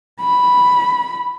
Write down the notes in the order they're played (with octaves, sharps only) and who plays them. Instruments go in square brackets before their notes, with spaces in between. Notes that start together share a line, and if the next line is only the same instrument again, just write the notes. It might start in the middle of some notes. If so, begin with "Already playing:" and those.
[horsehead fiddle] B5